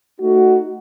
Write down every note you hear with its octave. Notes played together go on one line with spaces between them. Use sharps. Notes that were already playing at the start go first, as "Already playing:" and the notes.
A3 D#4 F#4